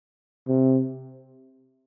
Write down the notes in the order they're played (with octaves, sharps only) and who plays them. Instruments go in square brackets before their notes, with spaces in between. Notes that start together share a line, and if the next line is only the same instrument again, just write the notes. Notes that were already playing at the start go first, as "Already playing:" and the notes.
[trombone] C3